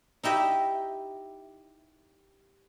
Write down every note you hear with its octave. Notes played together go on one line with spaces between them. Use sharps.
D#4 E4 G4 D#5 E5